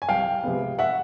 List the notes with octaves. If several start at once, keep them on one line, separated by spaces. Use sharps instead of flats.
G#5
C2 F5 G5
C3 F3 G#3 B3
E5 F#5